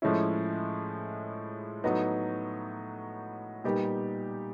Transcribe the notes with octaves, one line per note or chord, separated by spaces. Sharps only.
A2 F3 G#3 C#4 E4
A2 F#3 B3 D#4
A#2 G3 B3 D#4 G4